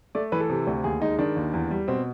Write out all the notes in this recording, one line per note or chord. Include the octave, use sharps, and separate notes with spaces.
A3 D5
E3 B4
A4
C3
D2
D#2 G#4
G#3 D#4
D#3 D4
D#2
E2
G3
B2 C4